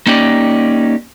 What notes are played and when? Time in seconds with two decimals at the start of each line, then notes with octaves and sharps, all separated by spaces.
0.07 A#3 C#4 D#4 G4 D5